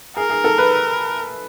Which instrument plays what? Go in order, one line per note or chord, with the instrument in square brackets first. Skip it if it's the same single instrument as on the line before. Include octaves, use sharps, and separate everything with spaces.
[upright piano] G#4 [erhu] A#4
[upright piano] G#4
A4
B4